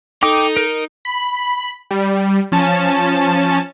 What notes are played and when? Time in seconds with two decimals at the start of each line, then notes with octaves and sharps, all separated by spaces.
0.23 D#4 A4 G5 D6 D#6
0.57 A#4
1.05 B5
1.91 G3
2.52 F3 C#4 A5